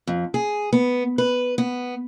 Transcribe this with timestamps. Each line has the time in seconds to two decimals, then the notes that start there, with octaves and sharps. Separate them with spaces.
0.07 F2
0.34 G#4
0.73 B3
1.18 B4
1.58 B3